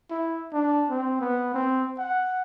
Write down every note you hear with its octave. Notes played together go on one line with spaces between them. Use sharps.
E4
D4
C4
B3
C4
F#5